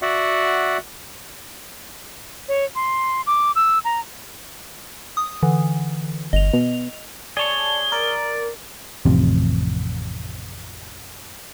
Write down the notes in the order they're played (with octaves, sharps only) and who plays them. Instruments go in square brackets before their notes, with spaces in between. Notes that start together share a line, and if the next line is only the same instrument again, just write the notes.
[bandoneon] F#4 D5 E5 F#5
[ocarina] C#5
C6
D6
E6
A#5
[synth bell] D#6
D3 E3
[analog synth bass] G1 [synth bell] D#5 F7
[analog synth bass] B2
[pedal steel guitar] G#4 C#5 [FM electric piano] D5 A5 C#6 [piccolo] G7
[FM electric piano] A#4 [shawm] D5
[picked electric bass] A1 F2 C3